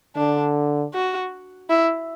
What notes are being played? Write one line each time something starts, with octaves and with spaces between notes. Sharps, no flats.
D3 D4
F#4
E4